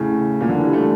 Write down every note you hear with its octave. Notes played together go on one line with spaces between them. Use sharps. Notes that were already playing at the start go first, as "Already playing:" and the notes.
Already playing: A2 C#3
A#2
D3
E3
G3
A3